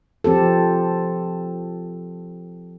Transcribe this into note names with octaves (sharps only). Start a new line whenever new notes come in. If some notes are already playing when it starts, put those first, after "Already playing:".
F3 C4 G4 A4